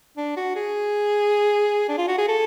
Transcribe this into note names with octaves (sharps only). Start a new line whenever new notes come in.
D4
F#4
G#4
D4
F4
F#4
G#4
A4